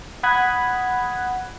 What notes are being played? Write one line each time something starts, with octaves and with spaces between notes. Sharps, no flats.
F#5 B5 D#6 F#6 G#6